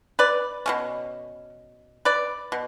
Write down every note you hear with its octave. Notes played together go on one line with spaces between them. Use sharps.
B4 D5
B2 A3 C#4
B4 D5
B2